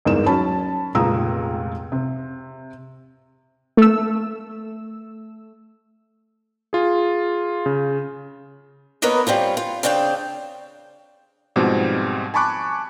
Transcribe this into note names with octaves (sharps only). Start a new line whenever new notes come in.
G1 E2 G#2 A#3 E7
F#3 C#4 A5 B5
F1 C#2 A#2 A#5 D#6 E6
C3
A3 E6
F4 G#4
C#3
A#3 B3 A#4 B4 C#5 D#5
G3 C4 C#4 F4
F4
C#3 C4 D4 F5 G5
G#2 B2 F3 G3 C4
G#5 A5 B5 C#6 D6 F#6